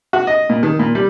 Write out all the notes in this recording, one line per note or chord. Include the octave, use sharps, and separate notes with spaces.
F#4
D#5
A#2
D#3
A#2
G3